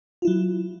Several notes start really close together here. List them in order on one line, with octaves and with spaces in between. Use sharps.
F4 E4 F#3